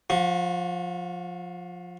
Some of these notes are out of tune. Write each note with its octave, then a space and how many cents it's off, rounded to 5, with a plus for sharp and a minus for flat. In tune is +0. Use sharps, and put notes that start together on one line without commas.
F3 +15 F#4 -20